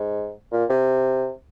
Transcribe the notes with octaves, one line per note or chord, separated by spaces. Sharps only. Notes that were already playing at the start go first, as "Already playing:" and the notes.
Already playing: G#2
A#2
C3